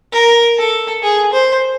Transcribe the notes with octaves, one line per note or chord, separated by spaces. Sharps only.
A#4
A4
G#4
C5